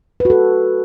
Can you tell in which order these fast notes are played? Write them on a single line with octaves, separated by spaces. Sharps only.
B4 F#4 A4